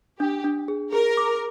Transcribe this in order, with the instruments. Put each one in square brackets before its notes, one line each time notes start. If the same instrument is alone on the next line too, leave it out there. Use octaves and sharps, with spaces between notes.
[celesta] D4 [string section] G4
[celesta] D4
G#4
[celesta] G#4 [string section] A#4
[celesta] D6